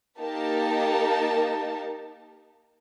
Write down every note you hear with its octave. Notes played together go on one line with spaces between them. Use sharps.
A#3 D#4 G4 A#4 A5